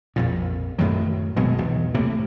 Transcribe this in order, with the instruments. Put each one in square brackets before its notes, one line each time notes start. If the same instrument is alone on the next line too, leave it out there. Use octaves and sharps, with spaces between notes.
[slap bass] A#1 F2 A#2
F#2 A2 D#3 F#3
G#1 B2 F#3 G#3
B1 E2
A2 C3 A#3